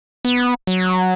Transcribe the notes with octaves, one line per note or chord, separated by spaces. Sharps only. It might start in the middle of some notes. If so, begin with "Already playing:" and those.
B3
F#3